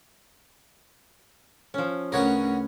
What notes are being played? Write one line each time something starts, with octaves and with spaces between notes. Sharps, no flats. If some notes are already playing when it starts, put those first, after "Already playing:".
F3 C#4
D2 C#3 B3 C#4 A#4 C#5 F#5